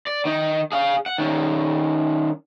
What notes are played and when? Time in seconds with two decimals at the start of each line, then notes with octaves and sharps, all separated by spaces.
0.07 D5
0.25 D#3 D#4
0.72 G#4 F5
1.06 F#5
1.18 D#3 C#4